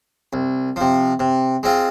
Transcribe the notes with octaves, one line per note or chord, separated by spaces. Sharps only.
C2
C3 F3
C3
G#3 C4 F4